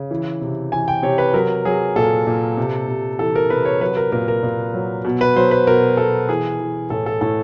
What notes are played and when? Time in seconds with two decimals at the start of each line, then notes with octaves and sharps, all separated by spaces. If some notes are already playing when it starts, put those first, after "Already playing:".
Already playing: C#3
0.11 E3
0.41 C3
0.72 E3 G#5
0.88 G5
1.03 C3 C#5
1.18 B4
1.34 F#3 A#4
1.65 F#3 G#4
1.96 A#2 A4
2.27 A#2
2.57 C3
2.88 C3
3.19 E3 A4
3.35 A#4
3.50 C3 B4
3.65 C#5
3.81 F#3 B4
3.97 A#4
4.12 A#2 A#4
4.28 A#4
4.43 A#2
4.74 F#3
5.05 B2
5.21 B4
5.36 F#3 C5
5.51 B4
5.67 B2 A#4
5.97 B2 A4
6.29 E3 G#4
6.60 E3
6.90 A2 A4
7.06 A4
7.21 A2 A4